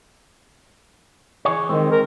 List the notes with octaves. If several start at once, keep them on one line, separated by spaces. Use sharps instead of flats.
E3 G#4 C#5
D#3 G#3 C4
A#4